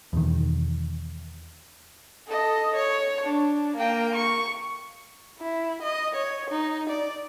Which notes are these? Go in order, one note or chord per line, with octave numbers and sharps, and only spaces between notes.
E2 B2 D#3
A4 D#5
C#5
D4
A#3 G5
C#6
E4
D#5
C#5
D#4
D5